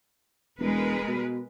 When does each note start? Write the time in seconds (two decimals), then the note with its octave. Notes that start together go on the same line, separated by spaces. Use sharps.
0.59 E1 G#3 A#4 B4
1.08 B2